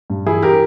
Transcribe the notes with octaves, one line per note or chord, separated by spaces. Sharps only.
G2
E3 E4 G#4
G4 A#4